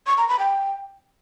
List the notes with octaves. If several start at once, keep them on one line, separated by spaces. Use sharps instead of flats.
C#6
A#5
B5
G5